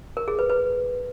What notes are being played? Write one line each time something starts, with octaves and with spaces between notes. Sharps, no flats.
A#4
G#4
B4
B4